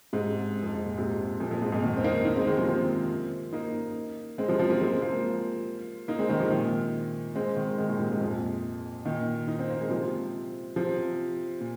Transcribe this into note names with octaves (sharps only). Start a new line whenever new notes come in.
G#2 C3
F2
G#2
A#2
G#2 C3
F2 A#2
F2
G#2
F2 A#2
A#2 D#3
C4
A#3 D#4
A#3 D#4
G#3 C4
D#3 G#3
C3 F3
F3 A#3
A#3 D#4
G#3 C4
C3 F3
C3 F3
F3 A#3
G#3 C4
F3 A#3
A#3 D#4
G#3 C4
D#3 G#3
C3 F3
A#2 D#3
G#3 C4
D#3 G#3
D#3 G#3
A#2 D#3
G#2 C3
G#2
F2 A#2
A#2 D#3
D#4
C4
A#3
G#3
C3 F3
C3 F3
A#2